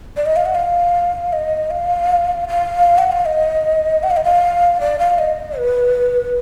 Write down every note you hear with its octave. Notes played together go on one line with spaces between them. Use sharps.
D5
D#5
F5
F#5
F5
D#5
F5
F5
F#5
F5
D#5
F#5
F5
D#5
F5
D5
F5
D#5
B4